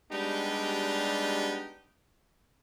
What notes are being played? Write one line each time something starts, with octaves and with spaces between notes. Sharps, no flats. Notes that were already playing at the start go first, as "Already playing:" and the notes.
G3 G#3 B3 D4 D#4 G4